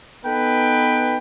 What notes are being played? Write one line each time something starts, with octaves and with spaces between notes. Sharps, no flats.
B3 D#4 A4 B4 G5